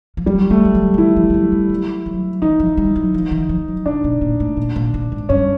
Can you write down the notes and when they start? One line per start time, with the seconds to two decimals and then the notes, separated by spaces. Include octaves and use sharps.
0.17 F3
0.26 F#3 G3
0.50 G3 A3
0.65 G3
0.75 F#3
0.94 D#3
0.98 E3 E4
1.16 F3
1.30 F3
1.34 F#3
1.52 G3
1.69 F#3
2.06 F#3
2.42 E3 D#4
2.60 F3
2.77 G3
2.95 F#3
3.14 F3
3.31 E3
3.49 F3
3.68 F#3
3.86 C3 D4
4.04 B2
4.21 A#2
4.40 A2
4.57 A#2
4.76 A#2
4.94 A#2
5.12 G#2
5.29 G2 C#4